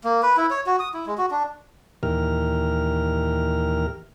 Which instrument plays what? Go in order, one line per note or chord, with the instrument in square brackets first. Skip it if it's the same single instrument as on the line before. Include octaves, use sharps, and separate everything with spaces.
[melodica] A#3
B4
E4
C#5
F#4
D#6
E4
G#3
F#4
D4
[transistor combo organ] D#2 A#2 E3 G4 A#4 F6